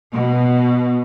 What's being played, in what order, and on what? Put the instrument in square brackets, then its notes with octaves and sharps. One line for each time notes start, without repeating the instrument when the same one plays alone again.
[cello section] B2